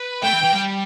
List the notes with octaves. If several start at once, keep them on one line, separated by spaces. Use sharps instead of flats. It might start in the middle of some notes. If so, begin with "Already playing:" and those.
Already playing: B4
A3 G5
E3
E3
G3